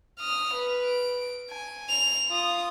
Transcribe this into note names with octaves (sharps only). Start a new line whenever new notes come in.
D#6 F6
B4
D7
G#5
F7
F4 D#6